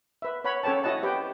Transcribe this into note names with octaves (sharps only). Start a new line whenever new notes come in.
B4 E5
B4 C#5 F#5 B5
C#4 A4 C#5 G5 A5
E4 F#4 D#5 F#5 A5
G4 B4 G5